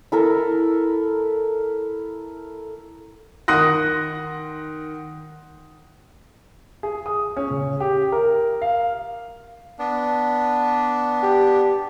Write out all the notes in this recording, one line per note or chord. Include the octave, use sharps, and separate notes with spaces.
E4 A4 A#4
D#3 F#5 C6 D#6 F#6 A#6
G#4
D#6
C#4
C#3
G4
A#4
F5
B3 D4
G4